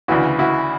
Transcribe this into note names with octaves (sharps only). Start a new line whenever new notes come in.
D2 C#3 E3 E4 F#4
E4 F#4